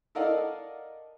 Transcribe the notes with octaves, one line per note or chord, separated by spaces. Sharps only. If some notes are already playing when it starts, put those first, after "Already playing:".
A4 A#4 D5 D#5 F5 F#5